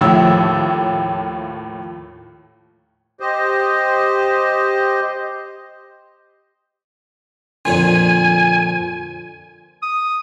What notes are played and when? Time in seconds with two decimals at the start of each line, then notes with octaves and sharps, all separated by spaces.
0.01 D#2 A2 F3 A3 C#5 E6
3.20 G4 C5 D#5
7.65 F2 A#2 D3 G#5
9.83 D#6